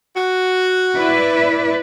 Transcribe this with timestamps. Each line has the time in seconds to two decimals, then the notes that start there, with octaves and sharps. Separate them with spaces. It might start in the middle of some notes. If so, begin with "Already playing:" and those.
0.15 F#4
0.96 E4 B4 D5